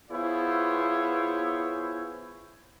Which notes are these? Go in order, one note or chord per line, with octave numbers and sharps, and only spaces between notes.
B3 E4 F4 G#4 C5 C#5